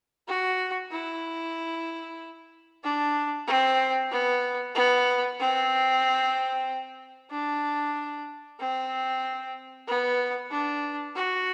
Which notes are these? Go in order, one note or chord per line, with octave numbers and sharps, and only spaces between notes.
F#4
E4
D4
C4
B3
B3
C4
D4
C4
B3
D4
F#4